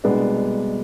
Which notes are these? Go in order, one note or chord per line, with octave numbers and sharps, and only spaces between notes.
C2 B2 G#3 B3 D4